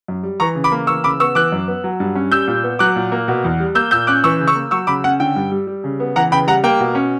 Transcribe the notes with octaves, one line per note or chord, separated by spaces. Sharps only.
F#2
G3
E3 A#5 C#6
C#3
B5 D6
A#3
E3 C#6 E6
C#3 B5 D6
B3 C#6 E6
E3 D6 F#6
F#2
B3
F#3
G2
C#4
G3 E6 G6
A#2
B3
F#3 D6 F#6
A#2
A#3
B2
E2
G3
A#3 E6 G6
A#2 E6 G6
C#4 D6 F#6
E3 C#6 E6
C#3
C#6 E6
A#3
F#3 C#6 E6
C#3 B5 D6
C#4 F#5
D3 G5
G2
G3
G3
C#3
B3
E3 F#5 A#5
C#3 G5 B5
G3 F#5 A#5
A#3 G5
B2
C#4